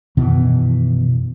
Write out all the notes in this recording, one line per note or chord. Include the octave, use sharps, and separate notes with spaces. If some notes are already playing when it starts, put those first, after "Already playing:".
F#2 B2 D#3 E3